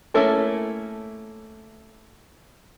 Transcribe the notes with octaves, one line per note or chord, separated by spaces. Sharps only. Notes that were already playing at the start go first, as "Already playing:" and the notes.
A3 A#3 C#4 E4 A4